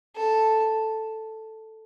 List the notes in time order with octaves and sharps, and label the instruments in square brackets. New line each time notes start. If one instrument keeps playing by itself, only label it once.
[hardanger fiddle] A4